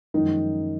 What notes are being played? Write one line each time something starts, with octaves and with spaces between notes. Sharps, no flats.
F#2 D#3 F3 G#3 D#4